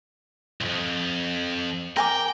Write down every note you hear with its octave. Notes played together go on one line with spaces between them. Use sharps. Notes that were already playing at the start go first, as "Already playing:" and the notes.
C2 F2
A#4 G5 G#5 D6